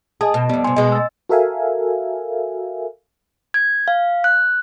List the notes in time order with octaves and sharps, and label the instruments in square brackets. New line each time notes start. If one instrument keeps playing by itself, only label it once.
[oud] G#4 [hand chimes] D#5 A5
[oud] B2
[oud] F2 G3 [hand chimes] B3
[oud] G2 C3 [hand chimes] G#5 C6
[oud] B2 G#3 [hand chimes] D#5
[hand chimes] E6 A6
[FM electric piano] F#4 A4 A#4 E5 F5 G#5
[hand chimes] G#6
F5
F#6